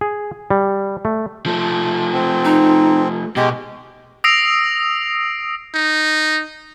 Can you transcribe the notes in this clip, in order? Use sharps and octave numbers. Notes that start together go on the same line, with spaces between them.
G#4
G3
A3
F3 A3
C4
D#4
B2 G#3 G4 D#5
D#6 E6 A#6 C7 D7 F7
D#4